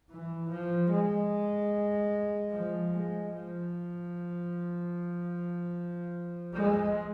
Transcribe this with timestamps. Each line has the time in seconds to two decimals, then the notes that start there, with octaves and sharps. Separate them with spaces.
0.11 E3
0.51 F3
0.92 G#3
2.52 F3
2.93 G#3
3.33 F3
6.55 G#3